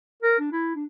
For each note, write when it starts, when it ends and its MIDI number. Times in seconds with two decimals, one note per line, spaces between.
0.23 0.35 70
0.39 0.50 62
0.52 0.72 64
0.75 0.85 62